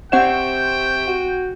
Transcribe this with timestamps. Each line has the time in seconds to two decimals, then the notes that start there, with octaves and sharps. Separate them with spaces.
0.12 C3 C4 C5 D5 F#5 G5 C#6 E7
1.07 F#4